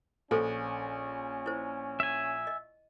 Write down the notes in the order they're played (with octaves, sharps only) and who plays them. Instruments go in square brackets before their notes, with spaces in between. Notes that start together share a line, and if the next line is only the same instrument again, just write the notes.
[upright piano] A#1 [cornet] C#4 [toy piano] F4 A4 C5
[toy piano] E4 C5
[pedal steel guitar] E5 G#5
[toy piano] D#5